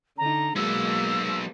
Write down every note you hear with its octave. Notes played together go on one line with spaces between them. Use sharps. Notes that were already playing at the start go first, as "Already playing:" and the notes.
D3 D#4 A#5
F#3 G#3 A#3 B3 E6